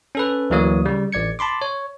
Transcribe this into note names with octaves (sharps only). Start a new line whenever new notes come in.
C#4 A4 B4
D2 E3 F#3 A#3 C#5 D#6
C#3 G3
A1 D5 G#6 C#7
A5 B5 C6 D6
C#5